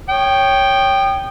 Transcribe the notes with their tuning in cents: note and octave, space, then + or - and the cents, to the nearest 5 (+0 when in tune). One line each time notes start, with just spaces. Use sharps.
C#5 +0 G5 +0 D#6 -35